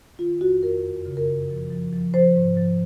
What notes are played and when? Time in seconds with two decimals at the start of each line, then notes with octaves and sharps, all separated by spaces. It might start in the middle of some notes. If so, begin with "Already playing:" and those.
0.19 D#3 F4
0.40 F2 F#4
0.63 F2 A#4
0.84 F#2
1.06 C#3
1.17 A#4
1.27 F#2
1.50 F3
1.70 F3
1.93 F3
2.14 F3 C5
2.36 G#2
2.57 F3